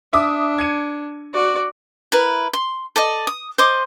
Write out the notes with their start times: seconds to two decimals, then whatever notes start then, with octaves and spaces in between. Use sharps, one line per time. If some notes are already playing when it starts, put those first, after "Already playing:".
0.13 D4 E5 D6 D#6
0.58 G#6 C#7 D#7
1.33 F#4 D5
2.12 E4 A#4 B4
2.53 C6
2.96 A4 D5 D#5
3.27 D#6
3.58 C5 D#5 C6 D6